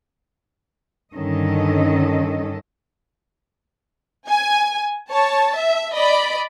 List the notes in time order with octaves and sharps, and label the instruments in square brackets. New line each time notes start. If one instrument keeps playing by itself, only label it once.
[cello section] G2 D3 D#3 C#4 A4 D#5
[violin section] G#5
C#5 A5
E5
D5 D#5 B5